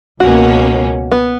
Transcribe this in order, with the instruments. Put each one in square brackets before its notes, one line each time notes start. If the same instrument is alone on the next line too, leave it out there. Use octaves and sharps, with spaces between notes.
[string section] C#2 B2 A#3 C#4 [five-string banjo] F#4
[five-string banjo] B3